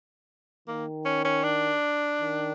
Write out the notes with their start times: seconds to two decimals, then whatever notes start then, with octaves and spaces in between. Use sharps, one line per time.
0.68 D#3 A#3
1.05 C#4
1.25 C#4
1.44 D4
2.21 D#3